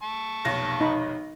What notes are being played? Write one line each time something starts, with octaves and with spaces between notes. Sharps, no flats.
A5 C#6
F1 B1 A#6
D#4 B5